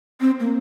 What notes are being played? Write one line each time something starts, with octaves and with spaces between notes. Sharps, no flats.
C4
A#3